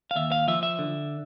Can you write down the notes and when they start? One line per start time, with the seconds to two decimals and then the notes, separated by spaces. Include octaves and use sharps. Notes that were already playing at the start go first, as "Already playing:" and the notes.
0.11 F5
0.16 D#2 E5
0.32 F5
0.48 F3 E5
0.63 E5
0.79 D3